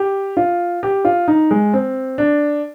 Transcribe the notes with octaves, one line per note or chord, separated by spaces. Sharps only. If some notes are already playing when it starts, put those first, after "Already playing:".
Already playing: G4
F4
G4
F4
D#4
G#3
C4
D4